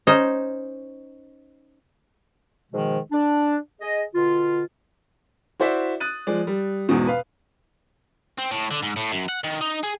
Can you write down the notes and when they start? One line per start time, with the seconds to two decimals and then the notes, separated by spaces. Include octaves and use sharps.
0.07 C#4 D#4 C5 D#5
2.71 G#2 B2 D#3 F3 G#3
3.12 D4
3.81 G#4 D#5
4.14 B2 D3 F4
5.60 E4 F#4 C5 D5 E5
6.00 D#6 F#6 A6 D#7
6.27 F3 G#3 D5
6.47 G3
6.89 E2 G#2 B2
7.07 B4 F5
8.38 C4
8.51 A2
8.71 D3
8.83 G#2
8.96 A2
9.12 F#2
9.29 F#5
9.44 D#3
9.61 D#4
9.84 G#4